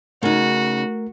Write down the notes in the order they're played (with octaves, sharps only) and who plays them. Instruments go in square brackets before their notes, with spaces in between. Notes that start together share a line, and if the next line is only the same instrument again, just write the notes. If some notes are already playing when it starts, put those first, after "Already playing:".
[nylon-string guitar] C#3 D#4 [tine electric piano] A3 A#4 [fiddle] F#4